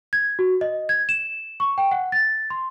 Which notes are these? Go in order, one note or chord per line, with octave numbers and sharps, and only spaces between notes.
G#6
F#4
D#5
G#6
E7
C#6
G5
F#5
A6
C6